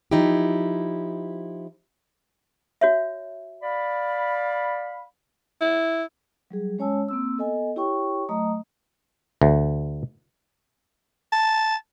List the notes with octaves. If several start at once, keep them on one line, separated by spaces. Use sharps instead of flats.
F3 D#4 E4 G4
F#4 C#5 E5
D5 F5 B5
E4
F#3 G3 G#4
G#3 C#4 C#5 G#5 A5 E6
A#3 C4 E6
B3 A4 D#5 G#5
E4 G4 C#5 G5 C#6
F#3 A3 D#5 A#5 D#6
D2
A5